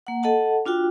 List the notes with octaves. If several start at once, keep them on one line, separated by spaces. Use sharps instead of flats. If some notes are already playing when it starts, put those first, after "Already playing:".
A#3 F#5
A4 D#5 F#5 A5
D4 F4 F#4 G5